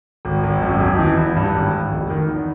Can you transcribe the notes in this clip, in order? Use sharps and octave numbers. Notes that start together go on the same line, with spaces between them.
G#1
G#1
F#2
E1
E3
E2
G2
G#1
G#1
F1
D#3
E2